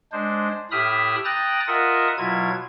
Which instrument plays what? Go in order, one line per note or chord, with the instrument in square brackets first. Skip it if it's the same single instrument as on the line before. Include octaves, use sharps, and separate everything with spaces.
[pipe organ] G#3 D4 C5
A2 G4 E5 B5 D#6 F6
G5 A#5 D#6 F#6 A6
F4 A#4 D#5 E5 F#5 D#6
B2 F#3 E4 F4 G#6